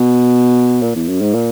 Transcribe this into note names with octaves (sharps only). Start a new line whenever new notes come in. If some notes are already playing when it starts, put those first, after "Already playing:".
Already playing: B2
A#2
E2
F#2
G#2
A#2